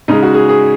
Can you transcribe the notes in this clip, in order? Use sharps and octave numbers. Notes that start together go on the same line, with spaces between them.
C#3 G#3 D#4
F#4
G#4
G#4